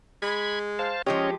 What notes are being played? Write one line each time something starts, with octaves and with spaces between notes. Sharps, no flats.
G#3 B5 G#6
C5 F5 A5
F3 G#3 C#4 G4 C#5 D#5